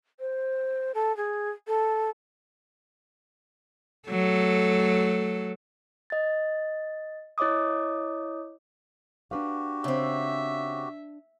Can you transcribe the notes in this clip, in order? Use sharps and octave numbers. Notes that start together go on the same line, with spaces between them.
C5
A4
G#4
A4
F#3 A3 A4
D#5 A6
E4 C#5 D#5 D6 D#6
D4 F#4 G4 B4 F5
C#3 C4 E5